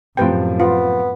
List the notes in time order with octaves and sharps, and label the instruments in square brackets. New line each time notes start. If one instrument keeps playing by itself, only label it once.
[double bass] F#2 A2 [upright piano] C3 F3 [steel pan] B4 G5
[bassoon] B3 [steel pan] F4